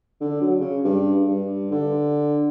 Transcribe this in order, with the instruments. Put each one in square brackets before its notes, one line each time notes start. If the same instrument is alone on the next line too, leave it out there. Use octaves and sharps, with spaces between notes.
[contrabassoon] D3
F#3
C#3
G2
G2
D3